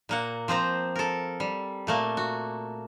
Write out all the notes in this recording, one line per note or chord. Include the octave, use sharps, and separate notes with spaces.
A#2 A#3 F#5
F3 C4 C5 A#5
A4 A#4
G3
A#2 A3 A#3
F#4